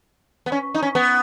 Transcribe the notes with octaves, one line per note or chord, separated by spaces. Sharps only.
B3
C#4
D#4
C#4
B3